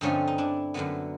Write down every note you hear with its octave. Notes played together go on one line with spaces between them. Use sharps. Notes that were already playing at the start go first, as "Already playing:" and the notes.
G2 D3 F3 A3 C4 C#4 D#4
D#4
D4 E4
F#2 D3 F#3 B3